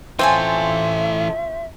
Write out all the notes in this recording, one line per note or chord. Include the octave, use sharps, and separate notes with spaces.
E3 C4 F4 A4 C#5 E5 G#5